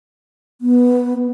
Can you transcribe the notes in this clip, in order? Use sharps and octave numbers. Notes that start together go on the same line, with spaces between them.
B3